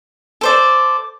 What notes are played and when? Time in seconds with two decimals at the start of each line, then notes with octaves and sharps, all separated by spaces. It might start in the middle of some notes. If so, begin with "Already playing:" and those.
0.41 A4 C5 D5